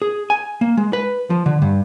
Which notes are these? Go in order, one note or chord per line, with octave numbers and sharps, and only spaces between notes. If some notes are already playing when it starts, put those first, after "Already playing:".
G#4
G#5
A#3
G#3
B4
F3
D3
G2